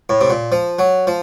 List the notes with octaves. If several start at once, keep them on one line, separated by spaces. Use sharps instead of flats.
A2
C3
A#2
F3
F#3
F3